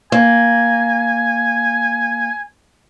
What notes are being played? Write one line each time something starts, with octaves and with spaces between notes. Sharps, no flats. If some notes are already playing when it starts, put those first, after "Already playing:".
A#3 G#5